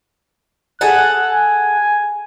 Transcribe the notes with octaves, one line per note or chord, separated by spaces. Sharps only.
G#4 A4 F#5 F#6
G#5